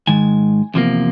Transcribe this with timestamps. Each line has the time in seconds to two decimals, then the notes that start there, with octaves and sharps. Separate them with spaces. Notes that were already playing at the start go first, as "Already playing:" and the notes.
0.07 G#2 D#3 G#3 G#5
0.74 E2 C3 F3 A#3